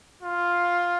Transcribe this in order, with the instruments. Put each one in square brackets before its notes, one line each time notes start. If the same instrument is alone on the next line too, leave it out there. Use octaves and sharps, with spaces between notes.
[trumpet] F4